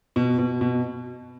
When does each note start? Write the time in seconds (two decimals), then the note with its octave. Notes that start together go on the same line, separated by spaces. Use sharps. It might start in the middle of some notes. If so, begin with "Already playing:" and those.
0.16 B2
0.39 B2
0.61 B2